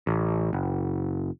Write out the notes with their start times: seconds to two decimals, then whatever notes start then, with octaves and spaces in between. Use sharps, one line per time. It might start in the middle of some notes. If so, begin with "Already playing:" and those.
0.07 A1
0.53 F#1